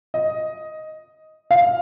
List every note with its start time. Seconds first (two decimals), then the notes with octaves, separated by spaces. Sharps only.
0.14 D#5
1.51 F5